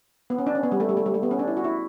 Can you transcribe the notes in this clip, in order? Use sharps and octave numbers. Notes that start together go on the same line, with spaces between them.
B3
C#4
D4
C#4
B3
G3
A3
G3
A3
G3
A3
B3
C#4
D4
E4
F#4
E4